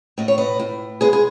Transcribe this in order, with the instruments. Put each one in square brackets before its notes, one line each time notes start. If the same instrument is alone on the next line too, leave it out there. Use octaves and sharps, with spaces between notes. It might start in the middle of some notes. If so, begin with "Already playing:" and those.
[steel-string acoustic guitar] A2 D#5
C#5
B4 D#5
A2
G#3 G#4 B4
G#4